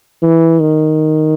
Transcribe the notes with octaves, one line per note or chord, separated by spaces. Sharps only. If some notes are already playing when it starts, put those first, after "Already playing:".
E3
D#3